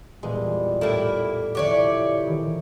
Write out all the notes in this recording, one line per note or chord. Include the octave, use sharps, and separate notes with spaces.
E2 A#2 G3 G#3
A2 A#3 E4 A5
F1 D3 E4 G4 C#5 D5
D#3 E3